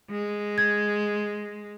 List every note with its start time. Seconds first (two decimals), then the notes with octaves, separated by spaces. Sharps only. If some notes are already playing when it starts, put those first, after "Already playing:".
0.11 G#3
0.58 G#6